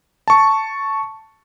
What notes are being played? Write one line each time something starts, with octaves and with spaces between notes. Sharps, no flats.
A5 C#6